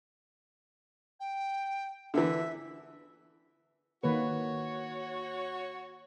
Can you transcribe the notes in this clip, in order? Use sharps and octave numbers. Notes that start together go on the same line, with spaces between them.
G5
D3 E3 E5
D#3 A#3 F#4 B4 C#5